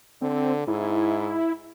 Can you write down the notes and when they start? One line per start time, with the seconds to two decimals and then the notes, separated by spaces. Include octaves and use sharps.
0.22 D3 C4
0.68 G#2 E4